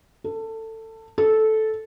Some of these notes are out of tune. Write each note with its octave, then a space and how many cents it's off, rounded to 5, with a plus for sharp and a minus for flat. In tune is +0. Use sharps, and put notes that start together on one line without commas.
A4 +20
A4 -10